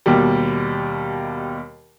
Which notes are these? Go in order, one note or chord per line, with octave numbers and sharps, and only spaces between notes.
D#2 B2 G3